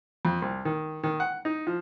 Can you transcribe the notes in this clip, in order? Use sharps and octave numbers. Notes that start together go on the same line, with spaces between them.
F2
C2
D#3
D#3
F#5
D#4
F3